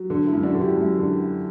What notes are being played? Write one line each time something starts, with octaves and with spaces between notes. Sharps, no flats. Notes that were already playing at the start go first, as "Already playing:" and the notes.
Already playing: F#3
D3
E4
F#2
D4 F#4
D3
E4 G4
F#2
D3